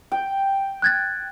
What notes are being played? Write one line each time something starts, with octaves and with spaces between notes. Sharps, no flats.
G5
F#6 G#6 A6